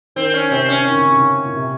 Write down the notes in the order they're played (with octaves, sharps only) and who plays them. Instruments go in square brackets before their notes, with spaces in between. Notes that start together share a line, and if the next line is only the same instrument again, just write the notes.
[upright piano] D#3 [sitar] C4
[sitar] C#4
[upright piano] C3 [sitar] C4
[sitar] C#4
[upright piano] D#3
C#3
C3
C#3
A#2
C3